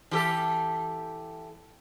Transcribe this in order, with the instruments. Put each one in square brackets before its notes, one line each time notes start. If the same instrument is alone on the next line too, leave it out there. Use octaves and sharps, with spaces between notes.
[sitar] E3 G4 A4